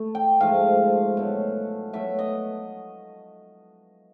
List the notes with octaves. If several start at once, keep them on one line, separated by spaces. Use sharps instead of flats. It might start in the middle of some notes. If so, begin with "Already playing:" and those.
Already playing: A3
G5
G#2 F3 A3 F5
B2 F#3 A3
B2 F#3 A3 E5
D#5